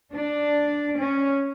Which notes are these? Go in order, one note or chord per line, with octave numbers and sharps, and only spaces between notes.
D4
C#4